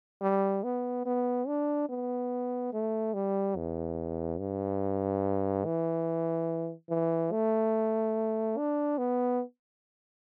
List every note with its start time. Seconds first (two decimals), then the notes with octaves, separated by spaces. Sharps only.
0.22 G3
0.63 B3
1.06 B3
1.47 D4
1.89 B3
2.73 A3
3.14 G3
3.56 E2
4.39 G2
5.65 E3
6.89 E3
7.32 A3
8.57 D4
8.98 B3